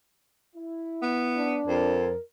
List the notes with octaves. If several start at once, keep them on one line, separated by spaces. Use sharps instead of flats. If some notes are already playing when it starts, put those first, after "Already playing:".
E4
B3
D4
F2 A#4